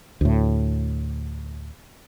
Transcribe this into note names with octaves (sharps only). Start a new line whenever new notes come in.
D2 A2